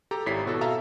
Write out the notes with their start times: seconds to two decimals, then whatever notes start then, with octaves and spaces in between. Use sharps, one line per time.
0.11 G4 A4 A#5
0.26 G#1 E4 C#5 B6 C7
0.46 B2 F#4 A4
0.61 A4 E5 F5 A5 A#5 E6